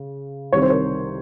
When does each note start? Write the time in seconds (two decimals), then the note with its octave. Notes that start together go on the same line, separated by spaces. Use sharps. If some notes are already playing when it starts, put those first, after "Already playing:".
Already playing: C#3
0.52 C2 C3 D#3 C#5
0.62 C5
0.70 A#4 C#5